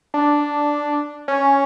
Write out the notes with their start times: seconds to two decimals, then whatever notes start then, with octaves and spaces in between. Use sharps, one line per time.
0.14 D4
1.28 C#4